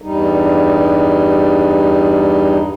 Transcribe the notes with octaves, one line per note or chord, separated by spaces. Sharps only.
E2 G2 G3 D#4